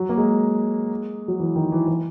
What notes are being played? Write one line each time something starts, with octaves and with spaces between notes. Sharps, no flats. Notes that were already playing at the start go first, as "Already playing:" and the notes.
Already playing: F#3
A#3
G#3
F#3
E3
D#3
E3
E3